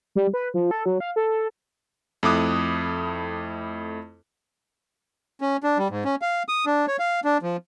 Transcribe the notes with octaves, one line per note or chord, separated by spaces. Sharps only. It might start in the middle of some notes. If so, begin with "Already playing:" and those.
G3
B4
F3
A4
F#3
F5
A4
F2 A3 E4 D6 D#6 F#6
C#4
D4
G3
G#2
C#4
F5
D#6
D4
C#5
F5
D4
F3